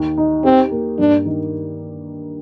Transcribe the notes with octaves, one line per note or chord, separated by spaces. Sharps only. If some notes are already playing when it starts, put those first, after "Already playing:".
Already playing: D#2
D#4
C4 G4
A#3
G2 D4
D#3